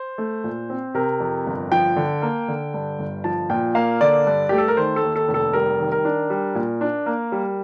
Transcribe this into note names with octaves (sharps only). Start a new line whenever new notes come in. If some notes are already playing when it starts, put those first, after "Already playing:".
Already playing: C5
A3
A#2
C4
C3 A#4
F2
G1
F3 G5
D3
A#3
D3
G2
G1
F3 A5
A#2 G5
A#3 F5
D3 D5
G2
A3 G4
A4
A#4
D#3 C5
A4
D#2
A4
F1
A4
G3 A#4
D#3
A#4
D4
G3
A#2
D4
A#3
G3